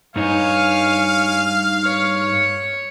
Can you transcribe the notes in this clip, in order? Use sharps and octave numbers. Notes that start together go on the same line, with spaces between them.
G2 D#4 C#5 F5 G#5
C#5